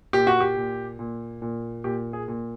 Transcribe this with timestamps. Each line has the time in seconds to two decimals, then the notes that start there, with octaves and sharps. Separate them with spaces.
0.13 A#2 G4
0.27 F#4
0.41 G4
0.57 A#2
0.99 A#2
1.42 A#2
1.84 A#2 G4
2.13 G#4
2.28 A#2